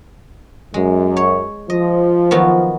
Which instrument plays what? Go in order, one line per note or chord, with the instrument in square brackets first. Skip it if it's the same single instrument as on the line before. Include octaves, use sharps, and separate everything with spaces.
[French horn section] F#2 [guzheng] G#3
[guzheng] C#5
[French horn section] F3 [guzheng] D#5
[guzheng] D#3 F#3 B3